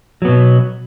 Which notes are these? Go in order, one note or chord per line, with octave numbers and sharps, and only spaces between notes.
B2 F#3 B3